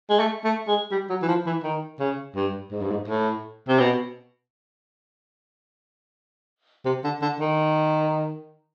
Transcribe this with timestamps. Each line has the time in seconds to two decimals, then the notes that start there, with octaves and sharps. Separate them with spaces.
0.09 G#3
0.19 A3
0.44 A3
0.67 G#3
0.91 G3
1.09 F#3
1.22 E3
1.28 F3
1.46 E3
1.63 D#3
1.99 C#3
2.36 G2
2.72 G#2
2.81 G2
2.91 G#2
3.07 A2
3.68 C3
3.79 B2
6.85 C3
7.04 D3
7.22 D3
7.40 D#3